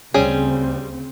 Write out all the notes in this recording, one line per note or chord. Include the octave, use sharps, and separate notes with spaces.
D2 C#3 G3 C4 C#4 G#4